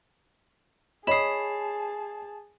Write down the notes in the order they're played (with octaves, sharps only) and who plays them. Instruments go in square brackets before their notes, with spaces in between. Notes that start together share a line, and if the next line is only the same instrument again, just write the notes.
[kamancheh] G#4 A5 [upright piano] C#5 D#5 [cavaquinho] B5 D#6 [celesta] C7 E7